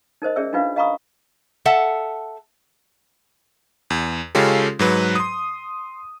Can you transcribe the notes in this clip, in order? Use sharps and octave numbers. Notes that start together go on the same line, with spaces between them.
D#4 A#4 C5 D#5
C#4 G#4 D5 E5 E6
D4 D#4 F4 B4 F5
D#5 F5 A#5 B5 C#6 D#6
A4 E5 F#5 A5
E2
C#3 G#3 C#4 F4 G4 A4
G#2 F#3 B4
C6 D#6